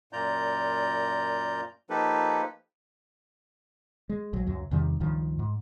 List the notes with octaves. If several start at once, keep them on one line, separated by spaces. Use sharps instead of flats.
F#2 A#2 F4 D5 A#5 G6
F3 A#3 D#4 G4 A4 B4
G#3
A#1 F#3
C#2 F#2 F#3
E2 C3 D#3 G3
C#2 G2 D#3 F3
G#2